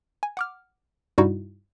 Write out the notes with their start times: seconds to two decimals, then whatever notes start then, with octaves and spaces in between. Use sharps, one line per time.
0.23 G#5
0.37 F#5 D6 F6
1.18 G2 C3 G3 D#4 E4 F#4